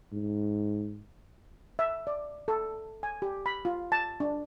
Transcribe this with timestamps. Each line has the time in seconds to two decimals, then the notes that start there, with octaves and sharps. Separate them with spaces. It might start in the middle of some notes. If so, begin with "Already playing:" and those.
0.13 G#2
1.79 E5
2.07 D5
2.48 A4
3.03 G#5
3.22 G4
3.46 B5
3.65 F4
3.92 A5
4.20 D4